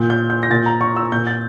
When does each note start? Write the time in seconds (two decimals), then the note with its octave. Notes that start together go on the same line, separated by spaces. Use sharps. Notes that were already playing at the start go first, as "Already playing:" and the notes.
Already playing: A#2 G6
0.10 G6
0.30 G6
0.43 A#6
0.50 A#2 A6
0.66 A#5
0.81 C#6
0.96 E6
1.12 A#2 G6
1.27 A6